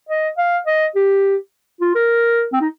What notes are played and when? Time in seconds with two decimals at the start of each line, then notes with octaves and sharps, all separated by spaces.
0.09 D#5
0.38 F5
0.66 D#5
0.95 G4
1.81 F4
1.95 A#4
2.53 C4
2.61 D#4